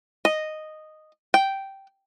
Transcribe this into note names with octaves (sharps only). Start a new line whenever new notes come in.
D#5
G5